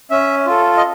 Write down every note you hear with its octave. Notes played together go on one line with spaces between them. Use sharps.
C#4 E5
F4 A4
D#5